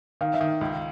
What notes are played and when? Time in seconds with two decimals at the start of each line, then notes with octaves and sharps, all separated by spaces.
0.21 D#3 F5
0.34 E5
0.41 D#3
0.61 C#2